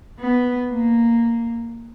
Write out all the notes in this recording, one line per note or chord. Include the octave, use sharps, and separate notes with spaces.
B3
A#3